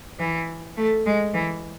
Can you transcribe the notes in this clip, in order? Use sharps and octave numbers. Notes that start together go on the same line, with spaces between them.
E3
A3
G#3
E3